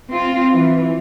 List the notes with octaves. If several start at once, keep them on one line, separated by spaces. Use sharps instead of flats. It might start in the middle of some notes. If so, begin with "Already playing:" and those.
C4 F4
E3